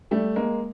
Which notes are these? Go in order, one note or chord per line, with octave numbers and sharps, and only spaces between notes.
G3 A3
G#3 A#3